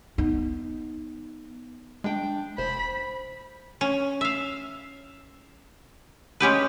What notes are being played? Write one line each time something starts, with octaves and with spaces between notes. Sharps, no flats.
B3 D#4
G#3 D4 G5
F1 C5 B5
C#4
E5 F5
G#3 C#4 G4 B4